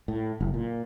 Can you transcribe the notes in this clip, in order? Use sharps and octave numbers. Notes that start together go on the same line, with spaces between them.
A2
F#1
A#2